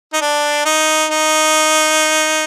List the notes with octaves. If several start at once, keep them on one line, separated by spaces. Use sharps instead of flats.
D#4
D4
D#4
D#4